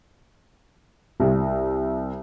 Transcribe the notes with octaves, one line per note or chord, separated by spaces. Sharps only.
C2